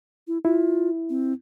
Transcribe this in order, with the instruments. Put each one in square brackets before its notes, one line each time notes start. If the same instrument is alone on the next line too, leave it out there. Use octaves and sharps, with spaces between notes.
[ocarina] E4
[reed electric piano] E4 [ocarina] F4
[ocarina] C4